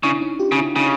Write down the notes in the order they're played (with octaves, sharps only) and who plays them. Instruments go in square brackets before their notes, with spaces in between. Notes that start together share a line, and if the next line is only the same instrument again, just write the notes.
[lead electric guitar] C#3 [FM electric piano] D4 E4
[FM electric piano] C#4 D#4
F4 G4
[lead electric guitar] C#3
[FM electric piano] E4 F#4
[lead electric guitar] C#3 [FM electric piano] D#4 F4